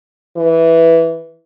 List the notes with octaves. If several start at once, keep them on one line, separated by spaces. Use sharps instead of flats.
E3